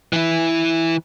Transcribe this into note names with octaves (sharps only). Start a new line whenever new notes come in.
E3 E4